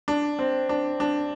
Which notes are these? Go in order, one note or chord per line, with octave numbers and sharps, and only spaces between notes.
D4
C4
D4
D4